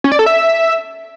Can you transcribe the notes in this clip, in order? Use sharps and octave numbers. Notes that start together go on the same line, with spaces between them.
C#4
D5
A4
E5